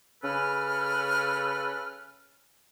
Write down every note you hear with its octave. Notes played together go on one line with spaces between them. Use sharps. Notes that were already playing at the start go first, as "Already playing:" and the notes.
C#3 C#4 A4 B4 F6